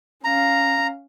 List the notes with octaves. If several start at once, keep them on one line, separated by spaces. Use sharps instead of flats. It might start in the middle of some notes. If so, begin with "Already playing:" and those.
C#4 F5 A#5